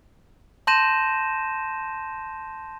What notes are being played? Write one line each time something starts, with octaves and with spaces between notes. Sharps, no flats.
A5 C6 G6 A#6 D#7 E7